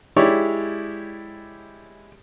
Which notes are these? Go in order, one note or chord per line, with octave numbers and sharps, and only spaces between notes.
G#3 E4 G4 C#5 D5